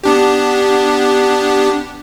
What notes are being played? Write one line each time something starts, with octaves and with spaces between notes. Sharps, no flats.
B3 D4 G4